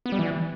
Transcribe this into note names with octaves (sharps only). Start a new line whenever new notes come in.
B3
G3
E3